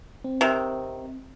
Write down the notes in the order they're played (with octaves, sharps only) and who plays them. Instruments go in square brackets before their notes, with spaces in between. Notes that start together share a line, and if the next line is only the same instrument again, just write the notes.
[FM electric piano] C4
[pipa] C3 D#3